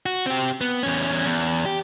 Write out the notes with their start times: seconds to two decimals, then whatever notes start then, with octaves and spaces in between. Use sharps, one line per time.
0.06 F#4
0.26 C4 G4
0.61 B3
0.83 E2 C#4
1.25 E2
1.66 G4